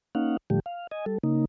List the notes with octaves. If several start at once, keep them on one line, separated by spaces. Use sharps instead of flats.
A#3 C#4 D#4 F5 F#5
A2 D3 F3 G3 A3 G4
F5
D#5 G#5
G3 A4
C#3 A#3 D#4